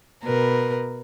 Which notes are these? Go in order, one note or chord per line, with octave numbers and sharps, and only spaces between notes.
B2 A#4 B4